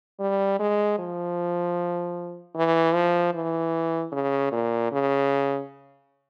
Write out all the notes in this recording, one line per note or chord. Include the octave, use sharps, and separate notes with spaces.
G3
G#3
F3
E3
F3
E3
C#3
A#2
C#3